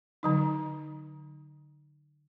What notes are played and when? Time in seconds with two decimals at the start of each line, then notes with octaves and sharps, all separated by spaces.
0.23 D3 F#3 D#4